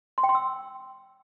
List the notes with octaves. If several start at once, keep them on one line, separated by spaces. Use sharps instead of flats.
C6
G5
C6
E6